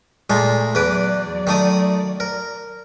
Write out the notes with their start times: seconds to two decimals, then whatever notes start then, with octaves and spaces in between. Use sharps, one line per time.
0.30 A#2 G#3 A3
0.75 E2 F#3 B4 D5 D6
1.47 D#3 A3 D#6
2.20 A#4